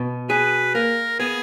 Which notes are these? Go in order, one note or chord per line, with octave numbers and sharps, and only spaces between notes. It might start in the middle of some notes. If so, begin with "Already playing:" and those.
Already playing: B2
G#4 B4
A#3 A#4
B3 G#4